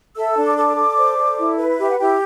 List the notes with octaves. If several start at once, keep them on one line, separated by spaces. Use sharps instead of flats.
A4 E5 E6
D4
D5 D6
A4
A4
C5
A4
E4
B4
G4 E5
F#5
E4 G4 G5